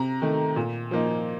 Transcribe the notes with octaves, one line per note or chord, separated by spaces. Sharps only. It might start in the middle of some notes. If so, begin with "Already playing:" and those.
Already playing: C3 A#5
D#3 A3
A#2
F3 A#3 D#4